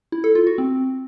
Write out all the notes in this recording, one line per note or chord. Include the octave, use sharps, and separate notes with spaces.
E4
A4
F4
F#4
C4